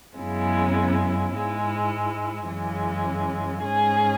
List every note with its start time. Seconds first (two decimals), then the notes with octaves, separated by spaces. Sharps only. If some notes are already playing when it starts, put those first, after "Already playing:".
0.16 F#2 C#3 G#3 B3 E4
1.33 G#2 G#3 E4
2.48 F#2 C#3 E3 G#3
3.64 G#2 G#3 C#4 G#4